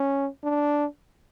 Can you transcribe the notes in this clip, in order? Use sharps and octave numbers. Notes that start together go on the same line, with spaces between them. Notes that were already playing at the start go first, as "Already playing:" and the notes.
Already playing: C#4
D4